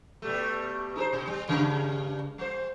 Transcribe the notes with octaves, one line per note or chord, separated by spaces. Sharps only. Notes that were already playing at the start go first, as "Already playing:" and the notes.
B2 G3 A3
D#4 G4 C5
B2
G3
G2 C#3 G#3
G3 C5